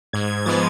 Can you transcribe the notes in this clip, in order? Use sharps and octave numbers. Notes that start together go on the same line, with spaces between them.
G#2 G#6
G#6
F3 G#3 B3 A6